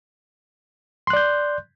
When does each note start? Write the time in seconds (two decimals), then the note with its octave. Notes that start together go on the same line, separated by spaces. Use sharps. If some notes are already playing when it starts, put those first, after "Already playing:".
1.07 C6
1.10 F#6
1.13 D5
1.16 G6